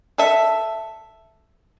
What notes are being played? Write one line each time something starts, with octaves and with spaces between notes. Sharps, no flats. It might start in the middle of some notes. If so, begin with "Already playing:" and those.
A4 E5